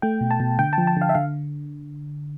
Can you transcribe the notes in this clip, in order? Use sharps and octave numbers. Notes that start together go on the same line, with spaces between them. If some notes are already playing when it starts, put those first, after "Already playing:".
A3 G5
B2
A5
B2
D3 G5
F3 A5
A5
D3 F5
E5
D3 F5